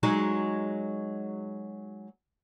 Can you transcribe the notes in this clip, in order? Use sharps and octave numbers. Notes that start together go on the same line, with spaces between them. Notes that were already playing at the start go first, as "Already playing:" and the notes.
F#3 G#3 D#4